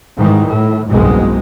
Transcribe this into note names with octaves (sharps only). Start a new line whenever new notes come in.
G#2 D#3 E3 G3
A2
F#1 C2 G#2 B2 G#3